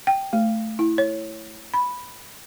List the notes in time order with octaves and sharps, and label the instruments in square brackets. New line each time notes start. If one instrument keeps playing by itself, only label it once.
[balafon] G5
A3
E4
C#5
B5